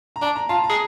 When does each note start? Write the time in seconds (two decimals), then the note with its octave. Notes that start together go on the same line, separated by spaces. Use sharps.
0.16 A#5
0.22 D4 A5
0.36 A#5
0.49 F4 A5
0.64 A#5
0.69 G#4